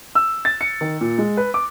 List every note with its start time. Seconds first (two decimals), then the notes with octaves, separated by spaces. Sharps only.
0.15 E6
0.45 A6
0.61 C#7
0.81 D#3
1.01 A#2
1.18 G#3
1.37 B4
1.54 D6